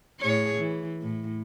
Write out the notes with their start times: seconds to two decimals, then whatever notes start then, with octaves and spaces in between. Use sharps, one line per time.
0.20 A2 G#4 C#5
0.59 E3
1.02 A2